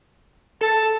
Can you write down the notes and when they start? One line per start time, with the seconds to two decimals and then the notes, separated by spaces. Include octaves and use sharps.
0.61 A4 A5